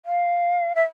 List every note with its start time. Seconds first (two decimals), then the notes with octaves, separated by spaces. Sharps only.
0.06 F5
0.75 E5